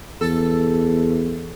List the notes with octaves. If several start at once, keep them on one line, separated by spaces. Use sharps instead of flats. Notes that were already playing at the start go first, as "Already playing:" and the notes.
E2 A4